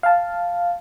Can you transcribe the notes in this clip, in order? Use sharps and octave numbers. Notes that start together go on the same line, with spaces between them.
F5 A5